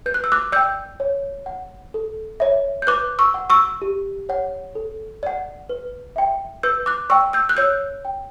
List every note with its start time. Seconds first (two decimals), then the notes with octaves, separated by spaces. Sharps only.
0.06 B4 G6
0.14 F#6
0.24 E6
0.32 D6 F#6
0.52 D5 G5 E6 G6
1.00 C#5
1.46 F#5
1.94 A4
2.40 C#5 E5
2.82 G6
2.87 B4 D6 F#6
3.19 C#6 E6
3.34 F#5
3.50 C#6 E6
3.82 G4
4.29 C#5 F#5
4.75 A4
5.23 D5 F#5
5.69 B4
6.16 E5 G5
6.63 B4 E6 G6
6.86 D6 F#6
7.10 D5 G5 C#6 E6
7.33 E6 G6
7.49 F#6
7.57 C#5 E6 G6
8.05 G5